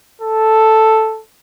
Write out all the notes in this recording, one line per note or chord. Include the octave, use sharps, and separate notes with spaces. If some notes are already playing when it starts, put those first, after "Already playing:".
A4